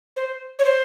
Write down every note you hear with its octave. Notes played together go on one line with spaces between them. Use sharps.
C5
C#5
C5